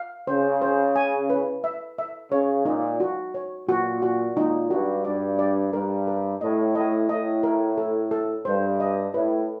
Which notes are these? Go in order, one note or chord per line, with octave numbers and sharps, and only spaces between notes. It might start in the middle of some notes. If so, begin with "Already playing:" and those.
Already playing: F5
C#3 C5
C5
G#5
B4
E5
E5
C#3 C#5
A#2 D#4
F#4
C#5
A#2 F#4
F#4
A#2 D#4
G2 F#4
G2 D5
D5
G2 A#4
A#4
A2 D#5
A2 D#5
A2 D#5
A#4
A4
A4
G2 C5
D#5
A2 B4